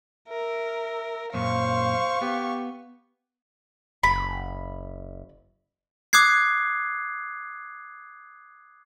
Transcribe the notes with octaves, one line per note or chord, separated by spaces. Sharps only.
A#4 E5
F#2 A#2 C5 F5 C#6
B3 G4
F#1 B5
D6 D#6 F#6 G#6 C7